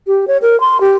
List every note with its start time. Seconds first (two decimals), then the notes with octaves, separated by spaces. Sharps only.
0.07 G4
0.28 C#5
0.42 A#4
0.60 C6
0.81 G4